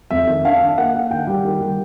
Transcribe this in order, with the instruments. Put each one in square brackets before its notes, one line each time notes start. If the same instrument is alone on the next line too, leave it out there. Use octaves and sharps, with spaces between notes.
[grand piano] F2 E5
D#3
D4 F5
D4
A#3 F#5
A#3
D#3 G5
G3
D#3
G3